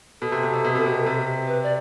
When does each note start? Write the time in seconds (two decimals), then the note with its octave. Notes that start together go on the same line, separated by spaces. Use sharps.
0.21 B2 A4
0.32 C3
0.43 B2
0.53 C3
0.64 B2
0.75 C3
0.86 B2
1.06 C3
1.48 B4
1.63 D5